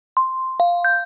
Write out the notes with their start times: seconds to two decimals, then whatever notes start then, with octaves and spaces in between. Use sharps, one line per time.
0.17 C6
0.60 F5
0.85 G6